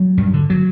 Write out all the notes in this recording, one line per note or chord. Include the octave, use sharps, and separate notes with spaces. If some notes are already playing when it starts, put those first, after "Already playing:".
Already playing: F#3
G2
D3
F#3